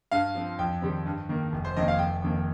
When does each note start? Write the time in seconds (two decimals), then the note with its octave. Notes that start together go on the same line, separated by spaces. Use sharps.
0.11 G2 F5
0.35 F3 C4
0.59 F2 G5
0.82 D#3 G3 C4
1.06 G2
1.29 D#3 A#3
1.52 F1
1.65 C5
1.76 F2 D#3 A#3 D#5
1.88 F5
1.99 F1 G5
2.22 F2 D#3 A#3